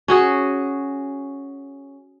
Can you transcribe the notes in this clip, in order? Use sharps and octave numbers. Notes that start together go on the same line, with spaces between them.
C#4 F#4 G#4